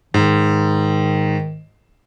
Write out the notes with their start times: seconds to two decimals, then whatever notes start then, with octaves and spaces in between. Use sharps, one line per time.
0.14 G#2 D#3